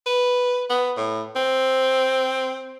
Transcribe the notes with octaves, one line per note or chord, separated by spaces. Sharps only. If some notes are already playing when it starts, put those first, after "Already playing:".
B4
B3
A2
C4